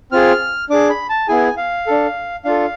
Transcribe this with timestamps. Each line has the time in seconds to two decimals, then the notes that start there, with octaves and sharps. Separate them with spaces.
0.12 C4 F4 G#4 F6
0.70 D4 G#4 D6
0.89 B5
1.09 A5
1.28 B3 E4 G#4 G#5
1.57 F5
1.87 D4 A4
2.45 D4 F4 A4 F5